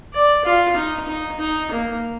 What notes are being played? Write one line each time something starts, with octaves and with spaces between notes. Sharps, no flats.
D5
F4
D#4
D#4
D#4
A#3